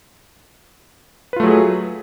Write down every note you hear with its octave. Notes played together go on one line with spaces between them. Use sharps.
F#3 A3 F4 G#4 B4